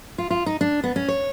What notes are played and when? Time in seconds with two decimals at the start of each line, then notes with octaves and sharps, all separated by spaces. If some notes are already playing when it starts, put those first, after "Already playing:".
0.18 F4
0.31 F4
0.46 D#4
0.61 D4
0.84 B3
0.96 C#4
1.09 C#5